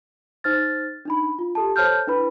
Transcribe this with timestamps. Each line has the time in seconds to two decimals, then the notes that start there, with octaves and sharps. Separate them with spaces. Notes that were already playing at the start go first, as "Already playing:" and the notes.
0.44 D#4 C5 F6 A6
1.05 D4 D#4 B5
1.39 F4
1.55 G4 A4 A5
1.76 A4 C5 C#5 A5 F6 G6
2.07 D4 E4 B4 B5